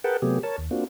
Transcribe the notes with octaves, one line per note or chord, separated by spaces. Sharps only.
G#4 A#4 B4 F#5 G5 A5
C3 F#3 A3 B3 G4 G#4
A#4 C#5 A5
D#2
A#3 C4 D4 F4 F#4